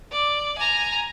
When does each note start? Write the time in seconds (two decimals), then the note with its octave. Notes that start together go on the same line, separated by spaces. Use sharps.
0.12 D5
0.58 G#5 A#5